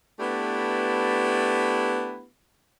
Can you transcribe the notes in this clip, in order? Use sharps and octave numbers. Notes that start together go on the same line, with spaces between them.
A3 B3 D4 E4 G4 B4